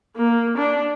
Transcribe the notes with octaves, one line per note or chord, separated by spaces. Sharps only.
A#3
D4